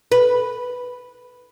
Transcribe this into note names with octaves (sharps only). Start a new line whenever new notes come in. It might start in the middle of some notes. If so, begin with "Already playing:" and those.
B4